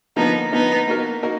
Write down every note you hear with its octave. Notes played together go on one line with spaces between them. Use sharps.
D3 F3 A#3 B3 D#4
D3 F3 A#3 B3 D#4
A#3 D#4 F#4 A#4
A#3 D#4 F#4 A#4